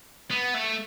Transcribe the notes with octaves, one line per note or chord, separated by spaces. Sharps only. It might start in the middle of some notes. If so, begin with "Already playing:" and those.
B3
A3